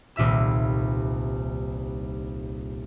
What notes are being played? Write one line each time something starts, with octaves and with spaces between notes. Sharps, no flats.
D#1 C2 A#2 E5 E6